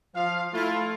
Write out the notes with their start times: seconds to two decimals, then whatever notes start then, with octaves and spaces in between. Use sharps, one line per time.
0.15 F3 F5
0.54 A3 E4 F4